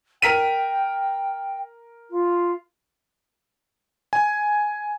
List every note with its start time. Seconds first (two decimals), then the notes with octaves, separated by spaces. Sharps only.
0.22 A#4 G5 B6 D#7
2.10 F4
4.13 G#5